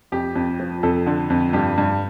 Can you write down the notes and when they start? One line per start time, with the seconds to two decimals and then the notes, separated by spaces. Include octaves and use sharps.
0.12 F2 G4
0.35 F2
0.60 F3
0.83 F2 A4
1.06 D3
1.30 F2
1.53 G2 G4
1.78 G2